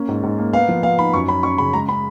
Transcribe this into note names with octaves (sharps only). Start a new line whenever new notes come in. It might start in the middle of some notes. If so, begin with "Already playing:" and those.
Already playing: A#3 C#4
G#2
G#2
A#3
B3 F5
F3
B3 F5
D#4 B5
F#2 C#6
C#4 B5
C#4 C#6
C#3 B5
G#3 A#5
C#4 B5